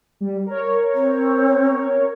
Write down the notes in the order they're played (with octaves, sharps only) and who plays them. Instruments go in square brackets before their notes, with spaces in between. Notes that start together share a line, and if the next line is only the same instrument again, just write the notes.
[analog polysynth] G3
A#4 C#5
[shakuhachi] C4